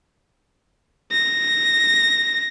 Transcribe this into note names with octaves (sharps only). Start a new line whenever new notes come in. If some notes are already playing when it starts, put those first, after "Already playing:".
A#6